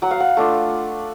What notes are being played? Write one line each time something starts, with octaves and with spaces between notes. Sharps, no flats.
F#3 F#5
F5
F#5
A3 D4 F4